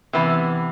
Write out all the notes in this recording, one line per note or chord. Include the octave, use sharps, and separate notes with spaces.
C3 E3 B3